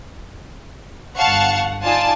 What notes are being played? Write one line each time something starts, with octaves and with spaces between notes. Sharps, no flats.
G1 F5 F#5 A5 C#6
D#4 F4 D5 G#5 A5